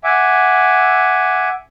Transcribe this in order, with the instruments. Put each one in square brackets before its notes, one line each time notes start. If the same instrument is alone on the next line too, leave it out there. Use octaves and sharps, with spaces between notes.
[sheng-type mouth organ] E5 F#5 G#5 D6